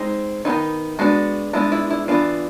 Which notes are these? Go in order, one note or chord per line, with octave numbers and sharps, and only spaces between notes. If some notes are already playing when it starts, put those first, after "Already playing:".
Already playing: G#3 C4 D#4
D#3 F#3 B3 D#4
G#3 B3 D4 F#4
G#3 B3 D4 E4
E4
E4
E3 G3 B3 D4 F4